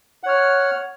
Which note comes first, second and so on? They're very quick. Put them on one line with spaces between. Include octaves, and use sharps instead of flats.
F#5 C#5 F6